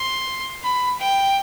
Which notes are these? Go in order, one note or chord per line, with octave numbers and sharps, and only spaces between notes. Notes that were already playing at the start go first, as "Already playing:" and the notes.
Already playing: C6
B5
G5